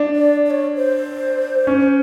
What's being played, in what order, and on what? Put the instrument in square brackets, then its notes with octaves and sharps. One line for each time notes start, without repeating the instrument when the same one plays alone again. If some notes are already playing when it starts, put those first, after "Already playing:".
Already playing: [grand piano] D4
[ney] D5
D5
C#5
C5
[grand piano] C#4